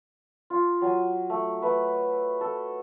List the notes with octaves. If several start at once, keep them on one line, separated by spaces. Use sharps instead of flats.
F4
F#3 G#5
A3
A3 B4
A4